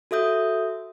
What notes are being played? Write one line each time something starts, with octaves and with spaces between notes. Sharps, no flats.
F#4 A4 E5 D#6 G6